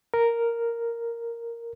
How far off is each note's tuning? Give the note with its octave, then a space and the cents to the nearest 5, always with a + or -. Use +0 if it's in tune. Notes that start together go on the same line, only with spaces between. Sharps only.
A#4 +0